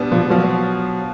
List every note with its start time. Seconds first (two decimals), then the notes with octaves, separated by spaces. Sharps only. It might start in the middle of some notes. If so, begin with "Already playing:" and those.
Already playing: B2 G3 B3 D4
0.12 B2 F3
0.30 F3 F#3